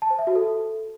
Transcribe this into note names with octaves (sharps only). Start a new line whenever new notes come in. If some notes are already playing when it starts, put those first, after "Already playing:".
A5
C5
E5
F#4
A4